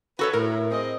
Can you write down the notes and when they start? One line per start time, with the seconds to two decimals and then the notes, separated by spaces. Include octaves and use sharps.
0.19 F#4 A4 B4 C#5
0.33 A2 A#4
0.71 C4 G#4 D#5